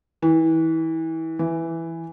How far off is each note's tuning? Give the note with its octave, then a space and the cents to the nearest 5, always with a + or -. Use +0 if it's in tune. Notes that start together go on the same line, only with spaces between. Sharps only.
E3 -25
E3 +5